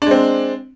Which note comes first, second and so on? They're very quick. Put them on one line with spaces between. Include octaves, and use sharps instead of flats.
D4 G#3 C4